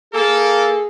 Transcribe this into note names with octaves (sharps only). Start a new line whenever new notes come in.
A#3 G#4 A4